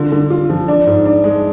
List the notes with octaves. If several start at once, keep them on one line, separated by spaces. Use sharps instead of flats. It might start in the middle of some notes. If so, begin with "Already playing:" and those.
Already playing: D3 F4
D3
F4
F3
D4
G#2
D4
G#3